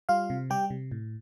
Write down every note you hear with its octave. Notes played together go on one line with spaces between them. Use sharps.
G3 F4 F5
C3
G3 G4 G5
C3
A2